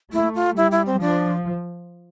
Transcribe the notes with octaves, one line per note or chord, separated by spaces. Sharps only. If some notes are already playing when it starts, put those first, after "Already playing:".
A3 E4
F4
G3 E4
E4
C4
F3 D4